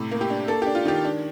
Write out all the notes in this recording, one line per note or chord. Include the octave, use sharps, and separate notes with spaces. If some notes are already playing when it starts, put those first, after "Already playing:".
Already playing: A2 C3
A#3
G4
D4
A#3 A4
D4 G4
F4
D#3 G4
D4